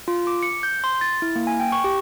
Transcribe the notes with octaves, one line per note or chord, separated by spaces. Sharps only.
F4
D6
C#7
G6
C6
A6
E4
A#3
G#5
G5
C#6
G4